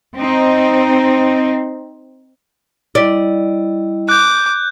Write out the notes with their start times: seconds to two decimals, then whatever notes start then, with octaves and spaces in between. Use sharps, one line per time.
0.16 C4 D#4
2.95 G3 E4 D5 D#5
4.09 D6 F#6 G6